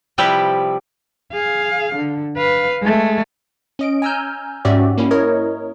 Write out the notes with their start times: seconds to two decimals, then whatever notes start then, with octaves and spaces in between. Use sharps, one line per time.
0.18 C3 F3 G3 E4 G4 B4
1.33 G#4 F5
1.96 D3
2.37 B4 F5
2.82 G#3 A3
3.79 C#4 D#5 D7
4.02 G#5 A#5 E6 F6 G6
4.65 G#2 C#4 F#4 G4 D5 E5
4.98 A#3 C#4 E4
5.11 E4 A#4 C#5 D#5